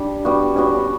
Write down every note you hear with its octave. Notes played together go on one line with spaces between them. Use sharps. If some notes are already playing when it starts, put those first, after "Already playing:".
Already playing: G3 D4
G3 B3 F#4
G3 B3 C#4 F#4
D4
C#4